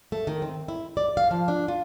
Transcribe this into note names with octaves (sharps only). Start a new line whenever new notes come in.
A3
D#3
C4
E4
D5
F5
F3
D4
F4